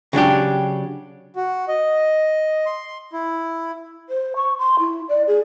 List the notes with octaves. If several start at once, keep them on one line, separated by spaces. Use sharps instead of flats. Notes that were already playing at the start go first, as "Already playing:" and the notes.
C#3 F#3 D4 G4
F#4
D#5
C6
E4
C5
C#6
C6
E4
D5
G#4